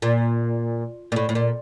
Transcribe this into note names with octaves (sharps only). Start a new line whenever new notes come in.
A#2
A#2
A2
A2
A#2